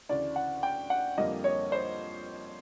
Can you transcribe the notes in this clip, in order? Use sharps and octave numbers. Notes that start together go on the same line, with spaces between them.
D2 C#3 E3 D5
F#5
G5
F#5
F2 D3 G3 A#3 D#5
C#5
C5